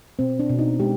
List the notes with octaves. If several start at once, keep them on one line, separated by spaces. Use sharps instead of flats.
B2 C4
D4
B2
D#4
G#3 G4